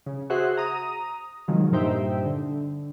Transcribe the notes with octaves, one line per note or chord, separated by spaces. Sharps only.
C#3
F#4 G#4 C5 E5 C6 F#6
A#5 D#6
C3 D#3 F3 F#3 G#3
G2 A#2 D#4 C5 E5 G5
D3